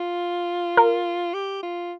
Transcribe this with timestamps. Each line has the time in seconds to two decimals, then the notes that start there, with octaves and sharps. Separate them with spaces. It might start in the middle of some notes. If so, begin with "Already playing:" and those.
Already playing: F4
0.77 A#4
1.34 G4
1.63 F4